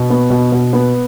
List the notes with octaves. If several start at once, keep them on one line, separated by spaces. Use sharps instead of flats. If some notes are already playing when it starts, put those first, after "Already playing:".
Already playing: B2
B3
B2
B2
B3